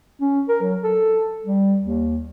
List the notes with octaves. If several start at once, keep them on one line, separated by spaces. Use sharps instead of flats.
C#4
A#4
F#3
A4
G3
D#2